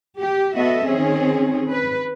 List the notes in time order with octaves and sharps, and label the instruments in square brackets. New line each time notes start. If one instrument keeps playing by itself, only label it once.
[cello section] G4
B3 F#4 A4 D#5 E5
D#3 C4 C#4 G#4
B4